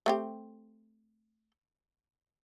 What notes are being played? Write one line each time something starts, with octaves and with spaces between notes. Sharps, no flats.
A3 C4 G4